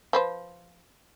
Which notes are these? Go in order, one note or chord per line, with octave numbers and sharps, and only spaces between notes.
F3 B4 C5